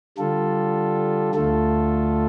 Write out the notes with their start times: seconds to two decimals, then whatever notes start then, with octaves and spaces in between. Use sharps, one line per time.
0.18 D3 G3 F4 A4
1.34 D2 D3 A3 F4 A4